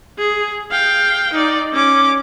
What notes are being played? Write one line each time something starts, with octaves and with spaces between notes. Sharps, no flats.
G#4
F5 G5
D#4 D5
C#4 D6